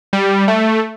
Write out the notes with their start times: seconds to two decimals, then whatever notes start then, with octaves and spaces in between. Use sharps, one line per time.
0.13 G3
0.48 A3